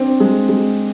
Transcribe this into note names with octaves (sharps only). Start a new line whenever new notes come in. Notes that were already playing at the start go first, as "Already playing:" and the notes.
Already playing: C4 D4
G#3
G#3